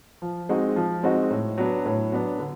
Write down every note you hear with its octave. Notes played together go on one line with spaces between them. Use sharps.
F3
G#3 C4 D#4 F#4
F3
G#3 C4 D#4 F#4
A2
F#3 B3 D4
A2
F#3 B3 D4
D3